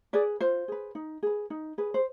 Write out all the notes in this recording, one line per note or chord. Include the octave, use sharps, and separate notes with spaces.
G#4 B4 D5
F4 C5
G#4 B4
D#4
G#4 B4
D#4
G#4 B4
C5